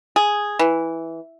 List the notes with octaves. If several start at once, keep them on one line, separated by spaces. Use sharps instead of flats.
G#4
E3